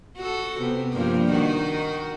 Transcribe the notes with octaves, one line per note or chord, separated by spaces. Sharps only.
F#4 A4
C3 B3
G2 F3 A#3
D#3 D#4 F#4